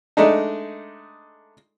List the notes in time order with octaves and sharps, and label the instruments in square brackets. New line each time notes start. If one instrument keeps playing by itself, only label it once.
[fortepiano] G#3 A3 D4 D#4